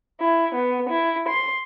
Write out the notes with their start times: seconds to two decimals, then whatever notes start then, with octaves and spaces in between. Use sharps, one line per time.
0.20 E4
0.55 B3
0.89 E4
1.27 C6